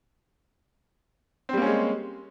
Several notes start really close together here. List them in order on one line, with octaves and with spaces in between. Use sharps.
C4 G3 A#3 C#4 G#3